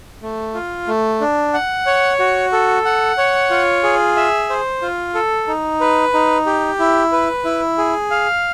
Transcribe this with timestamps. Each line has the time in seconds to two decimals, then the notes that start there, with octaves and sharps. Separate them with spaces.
0.22 A3
0.54 F4
0.88 A3
1.21 D4
1.53 F#5
1.86 C#5
2.19 F#4
2.52 A4
2.85 F#5
3.18 C#5
3.50 F4
3.83 G#4
4.16 E5
4.50 C5
4.82 F4
5.15 A4
5.48 D#4
5.81 B4
6.14 D#4
6.46 G4
6.79 E4
7.12 B4
7.45 E4
7.78 G#4
8.11 F5